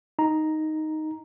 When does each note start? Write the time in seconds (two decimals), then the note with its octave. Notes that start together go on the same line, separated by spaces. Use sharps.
0.19 D#4 A#5